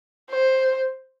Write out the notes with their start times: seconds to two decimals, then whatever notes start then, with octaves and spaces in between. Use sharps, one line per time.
0.30 C5